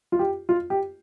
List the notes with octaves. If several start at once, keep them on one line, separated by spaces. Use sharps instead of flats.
F4
G4
F4
G4